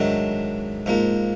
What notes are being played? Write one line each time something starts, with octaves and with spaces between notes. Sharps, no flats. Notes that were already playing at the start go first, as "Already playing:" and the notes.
Already playing: G#2 D#3 F#3 A3 D4
G#2 F3 A#3